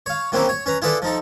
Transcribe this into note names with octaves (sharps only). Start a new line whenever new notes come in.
C#5 F5
F#3 A#3 C4 C#4 E4 G4
C#5
C#4 B4 A#5
E4 F4 G#4 A4 B4 D5
F3 D#4 A4